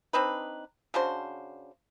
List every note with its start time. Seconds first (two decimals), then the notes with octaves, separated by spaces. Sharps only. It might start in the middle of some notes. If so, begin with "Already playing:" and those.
0.13 C4 D4 D#4 B4
0.94 C#3 D4 F#4 C5